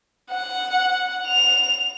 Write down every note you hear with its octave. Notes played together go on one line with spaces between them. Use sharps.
F#5
F7